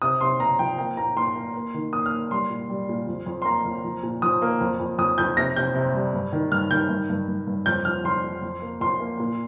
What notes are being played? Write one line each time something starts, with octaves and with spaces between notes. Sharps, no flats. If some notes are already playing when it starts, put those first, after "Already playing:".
C3 D#6
C3 C6
C3 A#5
F3 G5
A#3 G5
A#2 A#5
A#2 C6
A#3
A#3
D#3
A#3 D#6
F6
A#3
G3 C6
A#2
G3
A#2
F2
F2
C6
A#3 A#5
F2
F3
A#2
F3 D#6
A#3
F2
F2
F2 D#6
F2 G6
C3 A#6
C3 G6
C3
G3
G2
D#3
G2 F6
D#3 G6
G2
G2
G2
G2
F2 G6
F3 F6
F2 C6
F2
F2
A#3
F2 C6
A#3
A#2